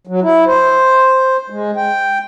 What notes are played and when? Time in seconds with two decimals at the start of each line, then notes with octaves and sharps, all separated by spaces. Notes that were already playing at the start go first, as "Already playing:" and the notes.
0.07 F#3
0.22 E4
0.47 C5
1.50 G#3
1.77 G5